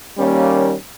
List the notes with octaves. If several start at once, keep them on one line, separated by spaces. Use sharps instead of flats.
D#2 G3 A#3 C#4